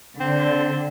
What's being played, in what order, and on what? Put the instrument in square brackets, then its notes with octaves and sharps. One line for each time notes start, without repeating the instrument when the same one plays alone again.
[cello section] D3 [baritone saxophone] C4